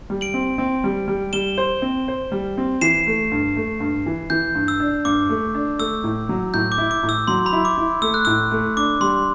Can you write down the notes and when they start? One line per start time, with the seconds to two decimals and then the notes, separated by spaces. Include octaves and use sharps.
0.10 G3
0.21 D7 F#7
0.34 C4
0.58 C4
0.84 G3
1.08 G3
1.33 G3 E7 G7
1.58 C5
1.82 C4
2.08 C5
2.32 G3
2.58 C4
2.81 E3 C7 E7
3.07 A3
3.32 G2
3.56 A3
3.80 G2
4.06 E3
4.30 E3 G6
4.55 G2
4.68 E6
4.80 D4
5.05 G2 D6
5.29 A3
5.54 D4
5.79 A3 E6
6.04 A2
6.29 F#3
6.54 A2 G6
6.72 D6
6.78 E4
6.91 D6
7.03 A2
7.09 E6
7.28 F#3 C6
7.46 B5
7.52 E4
7.65 D6
7.78 E4
8.02 A3 E6
8.14 F#6
8.25 A2 E6
8.51 A3
8.77 D4 D6
9.01 G3 C6